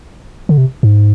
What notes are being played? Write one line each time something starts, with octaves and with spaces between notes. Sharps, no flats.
D3
C3
G#2